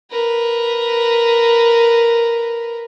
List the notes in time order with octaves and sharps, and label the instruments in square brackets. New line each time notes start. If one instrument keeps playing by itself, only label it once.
[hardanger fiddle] A#4 B4